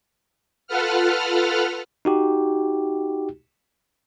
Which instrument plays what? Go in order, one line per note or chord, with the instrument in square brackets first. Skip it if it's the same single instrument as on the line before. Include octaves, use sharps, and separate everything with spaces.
[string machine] F4 A4 B4 F#5 F6
[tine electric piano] D#4 F#4 G4